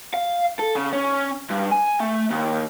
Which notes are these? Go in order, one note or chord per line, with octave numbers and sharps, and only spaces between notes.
F5
A4
C#3
C#4
G2
G#5
A3
D#2